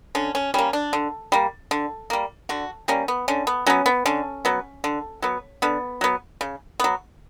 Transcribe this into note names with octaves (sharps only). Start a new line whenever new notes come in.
D3 C#4
C#4
G3 A#3 C#4
D4
D3
G3 A#3
D3
G3 A#3
D3 F#4
G3 A#3 C#4
B3
D3 C#4
B3
F#3 B3 C#4
B3
D3 C#4
F#3 B3
D3
F#3 B3
D3 B3
F#3 B3
C#3
F#3 B3